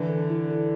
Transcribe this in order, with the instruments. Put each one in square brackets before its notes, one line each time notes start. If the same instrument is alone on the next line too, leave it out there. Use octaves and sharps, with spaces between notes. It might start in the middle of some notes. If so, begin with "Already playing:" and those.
Already playing: [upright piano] D3 E3
[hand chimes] A4
E4
A4